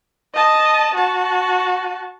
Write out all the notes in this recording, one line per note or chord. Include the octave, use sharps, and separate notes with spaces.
D#5 A5
F#4 A5